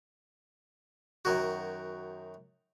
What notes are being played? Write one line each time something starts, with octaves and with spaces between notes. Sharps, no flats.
F#2 D#3 F#4